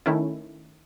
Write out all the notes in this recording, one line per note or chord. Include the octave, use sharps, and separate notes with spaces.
D#3 A3 C#4 E4